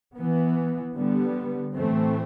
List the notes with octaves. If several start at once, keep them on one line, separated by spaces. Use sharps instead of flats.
E3 B3
D3 G3 B3
A2 E3 A3 C4